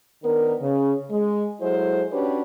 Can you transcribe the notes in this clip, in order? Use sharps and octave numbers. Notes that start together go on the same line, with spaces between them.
D#3 B3 D4 A#4
C#3
G#3
F#3 G#3 E4 A4 C5
C#4 D4 F#4 G4 B4 C#5